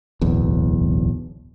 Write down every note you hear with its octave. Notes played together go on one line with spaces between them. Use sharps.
D1 B1 E2